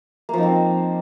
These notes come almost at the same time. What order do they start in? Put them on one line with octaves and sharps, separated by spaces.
A#3 F3 D#4 C4